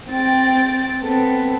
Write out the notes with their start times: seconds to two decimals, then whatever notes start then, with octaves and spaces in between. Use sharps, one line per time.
0.11 C4 G5 A6
1.03 B3 C4 A4